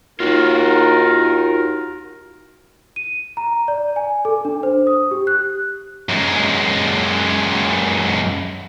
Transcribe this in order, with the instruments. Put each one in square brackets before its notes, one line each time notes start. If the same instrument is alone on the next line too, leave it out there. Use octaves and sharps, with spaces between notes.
[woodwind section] D#2 D#4 A#4 [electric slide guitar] F4 F#4
[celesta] D#7
A#5
D5
G#5
A4
D4
C5
D#6
G4
F#6
[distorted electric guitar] F#2 G#3